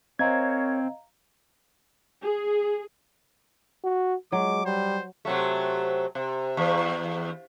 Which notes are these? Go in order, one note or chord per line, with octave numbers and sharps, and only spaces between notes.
C4 A#4 C5 C#5 D#5 F5 A#5 G#6
G#4
F#4
F#3 G#3 D6
G3 C5
C3 F#3 A3
C3
E2